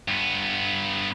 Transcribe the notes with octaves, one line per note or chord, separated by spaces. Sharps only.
G2 B3